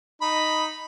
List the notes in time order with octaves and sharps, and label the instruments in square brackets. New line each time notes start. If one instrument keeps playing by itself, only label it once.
[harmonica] D#4 B5